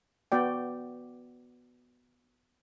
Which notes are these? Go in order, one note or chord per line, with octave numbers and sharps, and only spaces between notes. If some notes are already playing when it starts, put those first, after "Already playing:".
B3 F#4 D5 G5